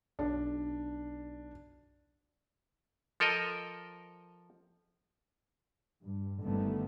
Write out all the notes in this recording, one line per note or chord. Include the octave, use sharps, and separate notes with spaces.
B1 D4
F3 A4 A#4 D#5
G2
G1 D3 D#3 G3 A3 B3